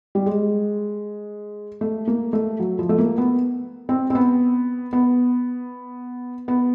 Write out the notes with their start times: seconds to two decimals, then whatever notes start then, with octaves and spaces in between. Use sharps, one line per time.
0.15 G3
0.26 G#3
1.81 A3
2.07 A#3
2.33 A3
2.60 F#3
2.79 F3
2.89 A3
2.98 A#3
3.18 B3
3.89 C4
4.10 C4
4.15 B3
4.93 B3
6.48 B3